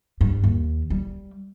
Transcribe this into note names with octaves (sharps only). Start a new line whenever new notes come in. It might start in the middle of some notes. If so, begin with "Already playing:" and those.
G2
D#2
G3